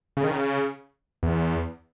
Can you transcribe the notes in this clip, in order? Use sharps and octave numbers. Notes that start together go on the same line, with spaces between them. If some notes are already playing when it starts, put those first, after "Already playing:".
C#3
D#3
C#3
E2